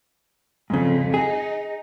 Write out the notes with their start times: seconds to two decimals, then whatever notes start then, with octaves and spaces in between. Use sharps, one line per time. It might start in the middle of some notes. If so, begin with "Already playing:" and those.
0.70 F2 G#2 C#3
1.14 D#4 G#4